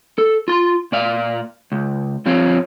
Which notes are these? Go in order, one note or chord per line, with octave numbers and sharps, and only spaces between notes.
A4
F4 C6
A#2 D5 F5
C#2
G2 F3 C4 F4 C#5 F5